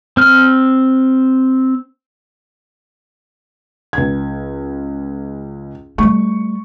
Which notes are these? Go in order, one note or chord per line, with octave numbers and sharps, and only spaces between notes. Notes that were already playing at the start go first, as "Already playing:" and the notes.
C4 F6
C#2 G#6
G3 A3 C#6